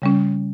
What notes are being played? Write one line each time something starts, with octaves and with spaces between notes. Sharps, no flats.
C#3 G3 C#4